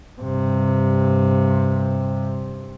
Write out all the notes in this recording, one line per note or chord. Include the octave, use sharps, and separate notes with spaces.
G2 C3